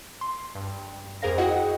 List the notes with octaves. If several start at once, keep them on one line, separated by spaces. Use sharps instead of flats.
C6
G2
F2 G#4 A#4 C5 F5 A#6
E4 F#4 G#4 D#5 F#5 G5